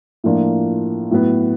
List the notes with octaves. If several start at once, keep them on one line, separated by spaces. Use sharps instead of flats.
A2 F3 A#3 D4 F4
A2 F#3 B3